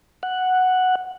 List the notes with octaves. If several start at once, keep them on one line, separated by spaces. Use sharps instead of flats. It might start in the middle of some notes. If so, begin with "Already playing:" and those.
F#5